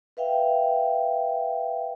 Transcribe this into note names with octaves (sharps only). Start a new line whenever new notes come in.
B4 E5 F5 G5